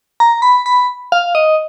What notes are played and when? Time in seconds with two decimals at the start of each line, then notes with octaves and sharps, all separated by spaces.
0.20 A#5
0.42 B5
0.66 B5
1.12 F5
1.35 D#5